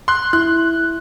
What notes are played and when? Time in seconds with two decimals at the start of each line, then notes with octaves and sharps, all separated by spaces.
0.08 C6 F#6
0.33 E4 F#6